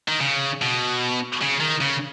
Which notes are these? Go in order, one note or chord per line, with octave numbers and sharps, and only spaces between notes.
D#3
C#3
B2
C#3
D#3
C#3